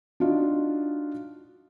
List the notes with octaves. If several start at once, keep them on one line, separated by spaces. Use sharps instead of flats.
D4 D#4 F4 F#4 D#5